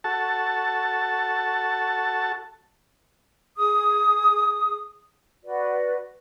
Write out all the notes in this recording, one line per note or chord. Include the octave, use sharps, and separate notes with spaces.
F#4 A4 A5
G#4 D#6
F#4 B4 D5